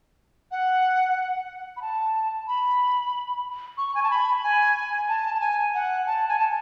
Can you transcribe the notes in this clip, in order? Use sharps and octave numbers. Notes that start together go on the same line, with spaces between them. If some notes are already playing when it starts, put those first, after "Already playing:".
F#5
B5
A5
B5
C#6
G#5
A5
B5
G#5
A5
A5
G#5
F#5
A5
G#5
A5